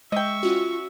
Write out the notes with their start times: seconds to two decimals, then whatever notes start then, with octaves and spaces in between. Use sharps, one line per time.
0.12 G#3 D#5 E5 G5 C#6
0.43 C#4 F4 F#4